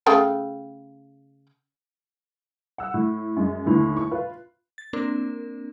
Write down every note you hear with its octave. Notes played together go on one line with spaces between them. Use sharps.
C#3 A3 G5
F#5 E6
A2
F#2 G#3
D#2 A2 D3 E3
C#6
F4 B4
A6
A#3 C4 D4 A#4